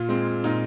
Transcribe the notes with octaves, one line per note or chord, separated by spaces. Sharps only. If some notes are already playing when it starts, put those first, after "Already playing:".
Already playing: A#2 F4
G#3 C4
A#2 D#4